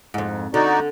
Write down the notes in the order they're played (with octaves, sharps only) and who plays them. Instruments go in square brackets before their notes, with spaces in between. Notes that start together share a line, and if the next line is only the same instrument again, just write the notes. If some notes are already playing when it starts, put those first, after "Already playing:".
[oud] F2 G#2
[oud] D3 [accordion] D#4 F#4 D5